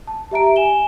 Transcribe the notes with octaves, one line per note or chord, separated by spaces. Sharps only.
A5
G4 E5 A#5 D7
G#5 E7 G7